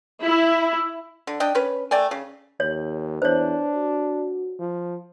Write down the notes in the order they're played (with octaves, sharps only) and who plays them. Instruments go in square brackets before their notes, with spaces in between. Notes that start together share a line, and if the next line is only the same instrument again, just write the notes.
[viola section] E4
[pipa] D3
D4 D#5 G5
C#4 B4
A3 D5 G5 G#5
C#3
[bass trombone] D#2 [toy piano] C#5
[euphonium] E2 [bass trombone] D4 [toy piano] C5 C#5
[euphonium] F#4
[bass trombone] F3